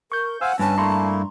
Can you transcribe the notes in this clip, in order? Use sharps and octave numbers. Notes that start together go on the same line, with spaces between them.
A#4 C#6 G6
C5 F5 F#5 G#5 E6
G2 C#4 B4 A5
A3 A#3 E4 A#5 C6 C#6